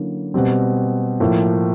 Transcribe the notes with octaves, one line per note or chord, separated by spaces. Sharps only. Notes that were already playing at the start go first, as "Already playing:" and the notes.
Already playing: D3 F#3 A#3 C#4 E4
B2 G3 C4
A2 F3 A#3